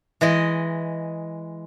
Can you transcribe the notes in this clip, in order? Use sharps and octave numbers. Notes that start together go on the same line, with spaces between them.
E3 G#3 D#5